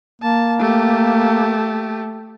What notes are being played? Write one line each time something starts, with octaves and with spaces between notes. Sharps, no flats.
A#3 A5
A3 G4